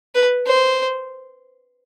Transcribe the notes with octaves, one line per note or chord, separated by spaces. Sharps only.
B4
C5